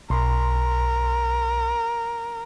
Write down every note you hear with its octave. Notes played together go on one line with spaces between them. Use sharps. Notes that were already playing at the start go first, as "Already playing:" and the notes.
B1 A#4 C6